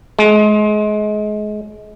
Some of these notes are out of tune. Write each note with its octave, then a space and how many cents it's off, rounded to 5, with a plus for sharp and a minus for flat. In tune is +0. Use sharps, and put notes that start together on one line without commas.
G#3 +30